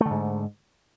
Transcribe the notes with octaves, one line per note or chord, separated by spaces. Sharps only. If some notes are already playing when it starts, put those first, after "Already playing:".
G#2 D3 A3